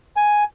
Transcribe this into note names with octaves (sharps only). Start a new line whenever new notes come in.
G#5